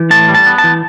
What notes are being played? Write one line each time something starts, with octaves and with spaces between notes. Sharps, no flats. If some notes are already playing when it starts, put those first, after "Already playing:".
Already playing: E3
A2 A5
G3
A5
B3
A5
E3